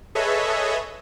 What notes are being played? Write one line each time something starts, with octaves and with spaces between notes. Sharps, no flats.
G#4 A4 B4 C#5 D#5 E5